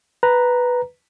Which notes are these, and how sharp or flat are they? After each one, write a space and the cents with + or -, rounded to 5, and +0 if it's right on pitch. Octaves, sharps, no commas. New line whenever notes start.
B4 +0 A#5 +0